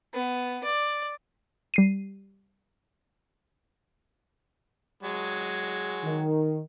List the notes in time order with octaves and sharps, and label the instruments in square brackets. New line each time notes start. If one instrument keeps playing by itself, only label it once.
[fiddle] B3
D5
[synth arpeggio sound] G3 C7 D#7
[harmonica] F#3 G#3
[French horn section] D#3